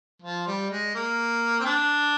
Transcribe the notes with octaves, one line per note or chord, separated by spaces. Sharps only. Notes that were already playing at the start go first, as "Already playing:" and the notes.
F3
G3
G#3
A#3
C4
D4